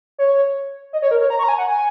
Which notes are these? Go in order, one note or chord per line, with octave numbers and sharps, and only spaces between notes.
C#5
D#5
C#5
A#4
C#5
A#5
C#6
A#5
G#5
F#5
G#5